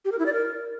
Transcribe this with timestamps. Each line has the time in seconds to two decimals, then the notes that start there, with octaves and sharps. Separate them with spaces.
0.05 G4
0.12 A#4
0.19 E4
0.26 D5
0.33 A#4